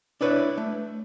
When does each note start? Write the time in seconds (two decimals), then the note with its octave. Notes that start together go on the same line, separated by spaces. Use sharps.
0.21 D4 E4 B4 C#5 D5
0.57 A3